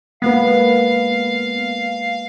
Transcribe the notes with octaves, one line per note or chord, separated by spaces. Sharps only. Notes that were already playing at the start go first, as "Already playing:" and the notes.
G#3 A#3 B3 B4 F5